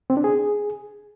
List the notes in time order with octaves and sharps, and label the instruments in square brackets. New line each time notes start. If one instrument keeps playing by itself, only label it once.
[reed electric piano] C4
D4
G#4